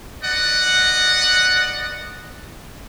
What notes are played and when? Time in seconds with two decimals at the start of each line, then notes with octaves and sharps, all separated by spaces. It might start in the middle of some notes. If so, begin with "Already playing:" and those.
0.23 B4 D5 D#5 F#5